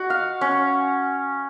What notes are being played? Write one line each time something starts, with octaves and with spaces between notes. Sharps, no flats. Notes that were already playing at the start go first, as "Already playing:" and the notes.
Already playing: F#4
F5
C#4